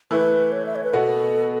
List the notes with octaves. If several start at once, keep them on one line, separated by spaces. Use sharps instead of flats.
E3 A3 E4 B4
C#5
E5
C#5
B4
B2 B3 F#4 A4